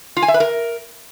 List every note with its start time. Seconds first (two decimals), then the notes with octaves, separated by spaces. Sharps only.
0.17 F4
0.22 G#5
0.28 E5
0.34 B4
0.40 A#4